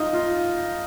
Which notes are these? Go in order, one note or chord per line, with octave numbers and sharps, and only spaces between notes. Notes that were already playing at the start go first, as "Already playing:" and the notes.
Already playing: D#4 F4
F4